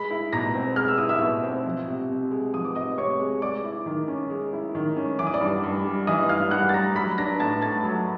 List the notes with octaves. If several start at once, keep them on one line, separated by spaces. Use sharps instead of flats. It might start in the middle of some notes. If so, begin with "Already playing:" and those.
Already playing: G#3 B5 B6
E4
B2 A#5 A#6
C4
G#3 F6
E6
E4 D#6
E5 E6
B2
C4
F3
C3
C3
G#3
F3 D#6
D6
C3 D#5 D#6
C3 C#5 C#6
G#3
G#3 D5 D6
E4
D#3
C#4
G#3
E4
D#3
C#4
E3 D6
D#6
D5 D6
G2
G2
G3
E3 D#5 D#6
G2 F5 F6
G2 F#5 F#6
A6
G3 A#5 A#6
F#3 B5 B6
D4 A#5 A#6
A2 A5 A6
A3 A5 A6
F#3